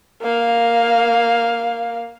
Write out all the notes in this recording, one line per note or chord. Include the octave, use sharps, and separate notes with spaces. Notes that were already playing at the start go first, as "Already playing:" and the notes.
A#3 F5